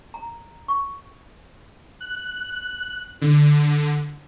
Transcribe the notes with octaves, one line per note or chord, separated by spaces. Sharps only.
A#5
C#6
F#6
D3